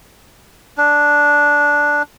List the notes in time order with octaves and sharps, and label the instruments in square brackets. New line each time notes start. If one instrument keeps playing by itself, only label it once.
[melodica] D4